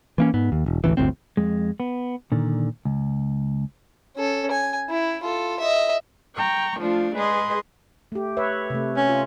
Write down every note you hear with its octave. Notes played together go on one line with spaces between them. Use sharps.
E3 A#3 C#4
G#2 B3
D#2
E1
A1 D2 C3 E3
G1 D2 A2 C4
F2 G#3
B3
A#2 D3 D#3
C#2
C#4 A4
G#5
E4
F4 A4
D#5 E5
G5 A#5 C#6
F3 A3 D4 F4
G#3 G#4 B4 D#5 C6
A3 G4
B4 C#5 E5
C3 A3
C#4
F4